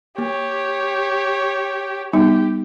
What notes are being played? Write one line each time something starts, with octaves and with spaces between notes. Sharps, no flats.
A#3 G4 C#5
G3 B3 D#4 G4